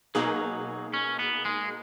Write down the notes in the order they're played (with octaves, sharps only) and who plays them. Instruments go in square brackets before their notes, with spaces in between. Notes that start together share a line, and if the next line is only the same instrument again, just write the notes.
[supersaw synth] B2 A#3 D#4 G#4 [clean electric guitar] F#3
[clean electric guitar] C#4
B3
G#3